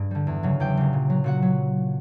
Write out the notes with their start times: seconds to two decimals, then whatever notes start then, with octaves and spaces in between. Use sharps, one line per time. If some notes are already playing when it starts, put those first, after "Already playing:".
Already playing: G2 G#4
0.11 D3 G3
0.27 E2
0.43 C#3 F#3
0.60 E2 G4 G5
0.77 C#3 F#3
0.93 A#2
1.10 F#3
1.24 A#2 F#4 F#5
1.42 F#3